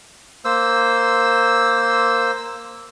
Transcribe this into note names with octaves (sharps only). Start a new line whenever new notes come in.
A#3 C5 E6